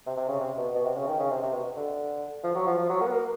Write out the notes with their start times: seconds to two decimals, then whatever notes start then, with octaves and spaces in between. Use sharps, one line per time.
0.06 C3
0.17 C3
0.28 C#3
0.40 C3
0.57 B2
0.74 B2
0.85 C3
0.96 C#3
1.07 D#3
1.19 C#3
1.31 C3
1.42 C3
1.53 B2
1.77 D3
2.44 F3
2.55 F#3
2.67 F3
2.78 F3
2.90 F#3
3.01 A#3
3.06 B3
3.12 A#3